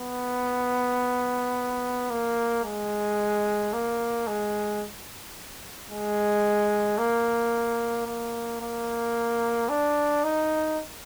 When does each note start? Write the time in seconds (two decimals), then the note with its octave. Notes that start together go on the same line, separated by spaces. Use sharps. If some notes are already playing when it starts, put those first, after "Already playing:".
Already playing: B3
2.10 A#3
2.64 G#3
3.73 A#3
4.27 G#3
5.90 G#3
6.98 A#3
8.07 A#3
8.61 A#3
9.69 D4
10.24 D#4